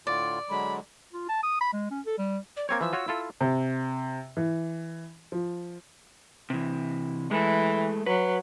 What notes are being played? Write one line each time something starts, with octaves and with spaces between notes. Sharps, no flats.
A2 D3 F4 D5
D3 F#3 G#3 B5
F4
A5
D#6
B5
G#3
C#4
A4
G3
D5
A#3 C4 C#5 G#6
E3 F3 E6
F4 F#4 C#5
E4 F4 A4
C3
E3
F3
C3 E3
E3 G#3 A3 A4
F#3 B4